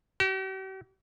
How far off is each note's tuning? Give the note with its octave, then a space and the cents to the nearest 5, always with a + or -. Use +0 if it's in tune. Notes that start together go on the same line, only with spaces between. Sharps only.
G4 -45